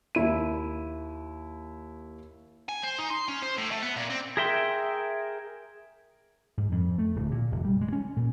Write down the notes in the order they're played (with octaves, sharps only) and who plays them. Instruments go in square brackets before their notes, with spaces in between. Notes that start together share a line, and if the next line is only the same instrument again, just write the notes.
[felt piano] D#2 E4 D#7
[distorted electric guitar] G#5
C5
D#4
C6
C#4
C5
A2
A3
B3
A#2
C4
[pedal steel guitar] G#4 A#4 E5 G5 C6
[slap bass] G#2
F2
A3
D1
A#2
F1
G3
G#3
C#4
A#2